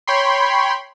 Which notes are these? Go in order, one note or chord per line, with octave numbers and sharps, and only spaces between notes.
C#5 G5 B5 C6